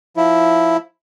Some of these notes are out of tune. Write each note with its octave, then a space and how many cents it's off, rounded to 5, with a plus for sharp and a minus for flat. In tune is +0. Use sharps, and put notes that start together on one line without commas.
F3 +0 E4 +0